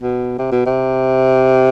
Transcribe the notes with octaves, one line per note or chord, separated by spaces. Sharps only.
B2
C3
B2
C3